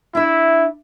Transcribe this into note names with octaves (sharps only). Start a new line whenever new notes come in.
D4 E4 E5